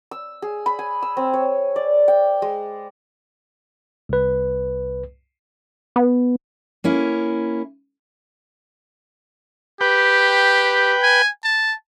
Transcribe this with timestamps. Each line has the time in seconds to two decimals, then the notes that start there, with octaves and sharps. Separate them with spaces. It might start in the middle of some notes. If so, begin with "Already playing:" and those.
0.11 E6
0.42 G#4
0.66 B5
0.79 G#5
1.02 E6
1.17 C4
1.34 C#5
1.76 D5
2.08 G5
2.42 G#3
4.09 C2 B4
5.96 B3
6.84 A#3 C#4 E4
9.81 G4 B4 G5
11.03 G#5
11.44 A5